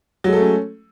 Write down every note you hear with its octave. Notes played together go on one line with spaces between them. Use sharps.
F#3 G#3 A3 C#4 A4